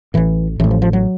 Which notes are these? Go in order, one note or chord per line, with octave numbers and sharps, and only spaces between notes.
A1 A2 E3
A1 A2 E3
F3
F3
F#3